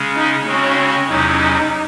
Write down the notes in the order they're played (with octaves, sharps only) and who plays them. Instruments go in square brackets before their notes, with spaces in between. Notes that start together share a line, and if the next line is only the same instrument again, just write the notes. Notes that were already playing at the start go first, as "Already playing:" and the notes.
Already playing: [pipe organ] C#3 G#3 C#4
[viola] D#4
[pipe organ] C#3 G#3 C4 F#4 [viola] C#4
[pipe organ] E2 C3 F#3 C#4 E4 [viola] D#4